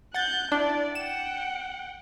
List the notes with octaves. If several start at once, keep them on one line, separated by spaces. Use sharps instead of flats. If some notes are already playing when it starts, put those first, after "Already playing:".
F#5 F#6 G6 A6
D4 E4 D5
F#5 G5 E7